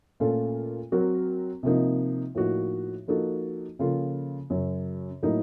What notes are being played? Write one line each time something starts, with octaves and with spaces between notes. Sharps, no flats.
A#2 A3 C#4 F4 A4
F#3 C4 F#4 A#4
C3 F3 A#3 D#4
A2 F3 A#3 D#4 F#4
F3 A#3 D#4 F#4 A4
C#3 F3 A#3 F4 A4
F#2 C#3 F#3
A2 F#3 A#3 D#4 A#4